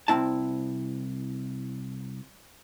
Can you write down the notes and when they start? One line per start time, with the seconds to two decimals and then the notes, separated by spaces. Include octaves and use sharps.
0.08 C2 D#3 C4 E4 A5